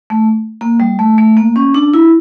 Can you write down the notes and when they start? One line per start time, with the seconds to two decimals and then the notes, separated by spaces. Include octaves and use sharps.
0.10 A3
0.61 A#3
0.80 G3
0.99 A3
1.18 A3
1.37 A#3
1.56 C#4
1.75 D4
1.94 E4